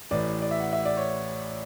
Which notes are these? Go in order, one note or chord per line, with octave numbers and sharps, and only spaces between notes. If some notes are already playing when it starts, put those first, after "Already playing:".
A1 A2 E3 D5
D5
E5
F#5
E5
D5
C#5